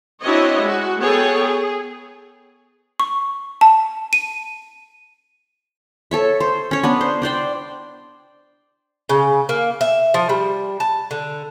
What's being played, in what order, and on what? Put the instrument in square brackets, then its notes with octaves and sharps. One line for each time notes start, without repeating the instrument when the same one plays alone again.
[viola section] C4 D4 E4 F#4 C#5 D#5
G#3 F#4
B3 G#4 A4 C#5 G5
G#4
[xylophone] C#6
A5
D#7
[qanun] A4 C#5 E5
C5
C#4 C#5
B3 D4 B4
C5
D4 C5 D5 G5
[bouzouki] C#3
A#3
E5
F3
G3
A5
D3